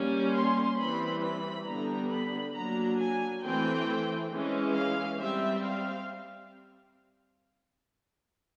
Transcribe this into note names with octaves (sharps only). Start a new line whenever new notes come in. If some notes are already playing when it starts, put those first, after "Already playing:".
Already playing: G3 A#3 C#4
C6
E3 G3 C4 B5
B5
D3 G3 B3 D4 A#5
B5
F#3 A#3 D4 A#5
G#5
E3 A3 C4 G5
E3 G#3 C#4
F5
G3 C4 E5
F5